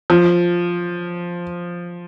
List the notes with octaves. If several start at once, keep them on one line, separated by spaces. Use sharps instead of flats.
F3